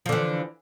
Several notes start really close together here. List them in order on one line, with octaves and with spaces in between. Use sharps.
F3 D3 E3